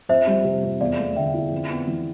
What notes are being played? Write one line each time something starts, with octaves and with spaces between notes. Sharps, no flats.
F2 C5 E5
G3
C3
F2
E2 D5 F5
A3
D3 E5 G5
E4
F2
B3
E3